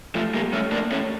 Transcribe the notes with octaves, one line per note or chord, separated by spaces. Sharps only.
F3 A3
G3 A#3
A3 C#4
A#3 D4
A3 C#4